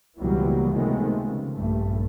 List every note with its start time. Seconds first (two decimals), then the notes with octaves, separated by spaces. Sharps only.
0.18 C#2 B2 E3 F#3 G3 A#3
0.72 C3 D#3 F3 G#3 A3 B3
1.23 C#3
1.55 A#1 G2 A3